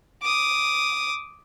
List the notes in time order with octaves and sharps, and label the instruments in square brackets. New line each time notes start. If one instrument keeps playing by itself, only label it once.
[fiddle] D6 D#6